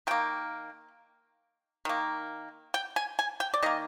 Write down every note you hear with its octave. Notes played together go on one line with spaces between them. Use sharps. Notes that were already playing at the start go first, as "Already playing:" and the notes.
D#3 A#3 G5
D#3 A#3
G5
G#5
G#5
G5
D5
D#3 A#3 D#5